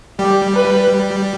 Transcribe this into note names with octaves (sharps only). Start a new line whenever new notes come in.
G3 G4
B4